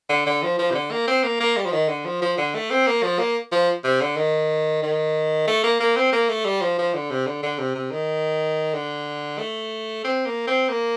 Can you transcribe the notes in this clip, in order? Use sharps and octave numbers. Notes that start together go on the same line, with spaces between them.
D3
D3
F3
F3
C3
D3
A#3
C4
A#3
A#3
G3
F3
D#3
D3
F3
F3
D3
A3
C4
A#3
F3
A#3
F3
C3
D3
D#3
D#3
A3
A#3
A#3
C4
A#3
A3
G3
F3
F3
D3
C3
D3
D3
C3
C3
D#3
D3
A3
C4
A#3
C4
A#3